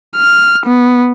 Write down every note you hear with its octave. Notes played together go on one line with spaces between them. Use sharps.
F6
B3